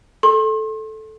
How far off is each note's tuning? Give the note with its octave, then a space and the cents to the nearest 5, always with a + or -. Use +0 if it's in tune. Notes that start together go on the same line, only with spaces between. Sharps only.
A4 -10 C6 +40